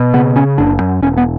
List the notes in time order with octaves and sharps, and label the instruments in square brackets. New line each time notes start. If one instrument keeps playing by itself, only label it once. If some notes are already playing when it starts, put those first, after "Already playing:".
Already playing: [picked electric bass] B2
C#3 B3
C#3 C#4
F#1 D4
F#2
E1 C#4
B3